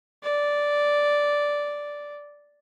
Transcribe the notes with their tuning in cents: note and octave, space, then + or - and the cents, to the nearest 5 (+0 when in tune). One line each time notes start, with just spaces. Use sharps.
D5 -5